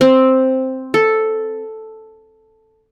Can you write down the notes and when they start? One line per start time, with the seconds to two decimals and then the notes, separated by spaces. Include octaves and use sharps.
0.01 C4
0.94 A4